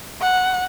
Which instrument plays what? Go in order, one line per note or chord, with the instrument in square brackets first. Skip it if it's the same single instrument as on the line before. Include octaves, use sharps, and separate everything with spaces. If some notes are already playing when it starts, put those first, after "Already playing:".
[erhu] F#5